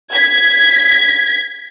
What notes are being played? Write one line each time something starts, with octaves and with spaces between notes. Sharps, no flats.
G#6 B6